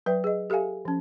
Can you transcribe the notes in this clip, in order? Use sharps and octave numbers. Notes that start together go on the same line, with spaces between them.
F#3 B4 E5 G5
G#4 D#5
G4 A4 E5 F5 G#5
F3 C#4